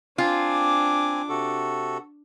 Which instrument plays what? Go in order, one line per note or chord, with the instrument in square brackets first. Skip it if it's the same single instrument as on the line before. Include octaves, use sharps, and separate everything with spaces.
[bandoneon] C4 G#5 [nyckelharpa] D4 D6 [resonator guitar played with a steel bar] F4
[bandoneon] C3 F#4 A4